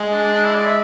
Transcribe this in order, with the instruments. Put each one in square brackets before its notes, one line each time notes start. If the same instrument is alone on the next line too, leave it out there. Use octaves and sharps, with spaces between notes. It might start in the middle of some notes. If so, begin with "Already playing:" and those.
Already playing: [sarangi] G#3
[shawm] D4
D4
D4
E4
D5
E5